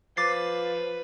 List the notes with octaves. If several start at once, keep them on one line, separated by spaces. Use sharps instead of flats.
F3 B4 D6 A6 C7